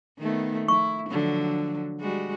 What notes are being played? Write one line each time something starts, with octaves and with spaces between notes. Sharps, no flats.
D#3 A3 B3
E4 C#6
D3 F3 F#3
G3 G#3 F#4